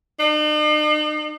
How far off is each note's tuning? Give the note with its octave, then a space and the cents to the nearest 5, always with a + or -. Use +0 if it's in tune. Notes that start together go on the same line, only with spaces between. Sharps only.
D#4 -45